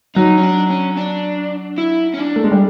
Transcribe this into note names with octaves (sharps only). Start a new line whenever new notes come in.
F#3 D#4
C#4
D4
C#4
D4
E4
C#4
D4
A3
G#3
G3